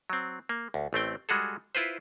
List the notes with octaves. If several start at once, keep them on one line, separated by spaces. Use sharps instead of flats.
F#3 C4
A#3
D2
A1 A3 C4 G5
G3 G#3 F#4 G#4 A4
E4 F4 B4 C5